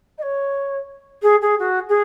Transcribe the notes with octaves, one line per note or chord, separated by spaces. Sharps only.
D#5
C#5
G#4
G#4
F#4
G#4